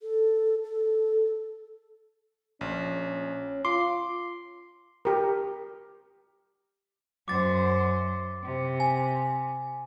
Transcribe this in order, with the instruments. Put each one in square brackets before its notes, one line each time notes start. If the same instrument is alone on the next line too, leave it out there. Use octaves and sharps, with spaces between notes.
[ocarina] A4
A4
[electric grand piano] A#1 [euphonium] C#4
[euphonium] F4 [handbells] C6 C7 [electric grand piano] D6
[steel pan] G4 A#4
[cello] F#2 C5 [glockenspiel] D6 A6
[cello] C3
[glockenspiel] G#5